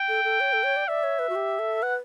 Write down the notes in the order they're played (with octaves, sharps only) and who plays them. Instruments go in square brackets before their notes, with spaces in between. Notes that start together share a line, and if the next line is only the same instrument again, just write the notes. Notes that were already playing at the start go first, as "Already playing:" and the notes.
Already playing: [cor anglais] G5
[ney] A4
A4
C#5
A4
C#5
D5
[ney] D5 [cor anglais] E5
[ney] C#5
B4
F#4
G4
A4
[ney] B4 [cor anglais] F#5